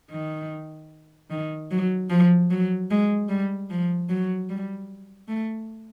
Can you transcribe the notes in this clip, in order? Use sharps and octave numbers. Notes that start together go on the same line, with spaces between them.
D#3
D#3
F#3
F3
F#3
G#3
G3
F3
F#3
G3
A3